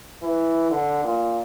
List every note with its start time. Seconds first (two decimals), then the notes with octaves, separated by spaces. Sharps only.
0.23 E3
0.71 D3
1.04 A#2